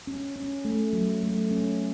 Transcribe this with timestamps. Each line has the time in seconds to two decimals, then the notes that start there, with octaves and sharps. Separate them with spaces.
0.07 C#4
0.36 C#4
0.65 A3
0.93 F#3
1.23 A3
1.51 C#4